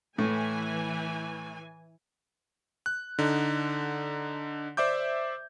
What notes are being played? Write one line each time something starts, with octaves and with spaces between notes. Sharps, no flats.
A2 E3 G#5
F#6
D3 D#4
C5 D5 E5 D6 G6